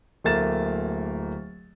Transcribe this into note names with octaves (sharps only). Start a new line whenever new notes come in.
D1 A3 A#3 A6 E7